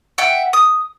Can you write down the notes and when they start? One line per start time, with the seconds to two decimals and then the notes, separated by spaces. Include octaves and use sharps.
0.18 E5 F#5 G5
0.53 D#6